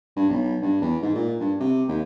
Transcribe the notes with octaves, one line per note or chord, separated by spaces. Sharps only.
G2
B1
G2
E2
G#2
A#2
G2
C3
D#2